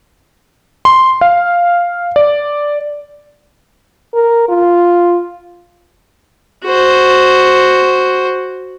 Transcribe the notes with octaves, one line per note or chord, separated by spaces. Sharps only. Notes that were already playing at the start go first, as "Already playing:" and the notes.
C6
F5
D5
A#4
F4
F#4 C5